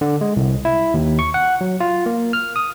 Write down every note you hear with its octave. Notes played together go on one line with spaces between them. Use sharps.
D3
G#3
C2
E4
D#2
C#6
F#5
F#3
F4
A#3
F6
D#6